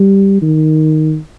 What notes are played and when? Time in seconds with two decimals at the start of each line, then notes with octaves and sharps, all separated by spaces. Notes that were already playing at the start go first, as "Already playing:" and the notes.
Already playing: G3
0.42 D#3